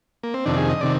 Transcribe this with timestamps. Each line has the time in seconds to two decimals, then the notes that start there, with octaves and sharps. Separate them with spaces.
0.23 A#3
0.34 C4
0.45 F2 C3 D#3 D4
0.57 G#4
0.69 D#5
0.81 C3 D#3 D5